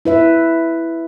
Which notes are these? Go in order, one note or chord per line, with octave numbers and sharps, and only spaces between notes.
E4 B4 E5